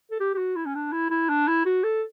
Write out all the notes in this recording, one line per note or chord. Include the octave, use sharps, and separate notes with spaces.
A4
G4
G4
F#4
E4
C#4
D4
E4
E4
D4
E4
F#4
A4